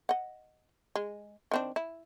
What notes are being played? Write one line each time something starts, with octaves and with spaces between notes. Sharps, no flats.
D#5 F#5
G#3
D#3 C4 D4
E4